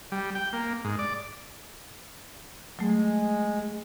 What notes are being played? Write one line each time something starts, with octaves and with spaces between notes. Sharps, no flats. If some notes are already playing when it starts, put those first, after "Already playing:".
G3
G5
A#3
G#2
D5
F#3 G#3 A3